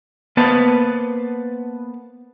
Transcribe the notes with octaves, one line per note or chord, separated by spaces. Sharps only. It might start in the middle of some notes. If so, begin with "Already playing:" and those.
A#3 B3 B4 C5 A5